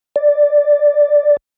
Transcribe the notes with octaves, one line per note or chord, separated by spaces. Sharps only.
D5